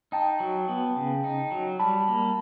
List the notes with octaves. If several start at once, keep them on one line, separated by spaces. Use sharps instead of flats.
D#4 G5 A5
F#3
B3
C#3
D#4
F#3
G3 A5 B5
A#3